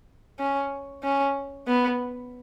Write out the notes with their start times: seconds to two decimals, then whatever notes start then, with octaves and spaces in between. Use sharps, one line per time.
0.39 C#4
1.03 C#4
1.67 B3